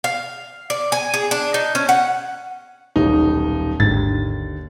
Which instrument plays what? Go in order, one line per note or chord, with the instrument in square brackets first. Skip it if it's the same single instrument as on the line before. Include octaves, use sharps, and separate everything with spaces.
[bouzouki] F5
D5
G#5
G#4
D4
D#4
C#4
F#5
[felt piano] D#1 B1 [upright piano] D#4
[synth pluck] G#1 [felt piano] D#2 D3 [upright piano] A6